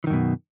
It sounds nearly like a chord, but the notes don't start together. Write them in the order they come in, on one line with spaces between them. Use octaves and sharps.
E3 D#3 F#2 B2